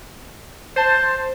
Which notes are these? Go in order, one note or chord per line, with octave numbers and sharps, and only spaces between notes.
C5 A5